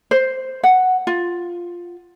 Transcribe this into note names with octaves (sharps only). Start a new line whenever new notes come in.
C5
F#5
F4